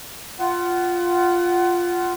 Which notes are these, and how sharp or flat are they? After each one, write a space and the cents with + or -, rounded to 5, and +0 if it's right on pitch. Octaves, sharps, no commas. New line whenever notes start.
F4 +0 F#5 +25